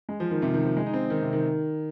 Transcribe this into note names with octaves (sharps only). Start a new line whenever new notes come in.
G#3
F3
D#3
C3
D#3
F3
G#3
D#4
C4
D#3
C3
D#3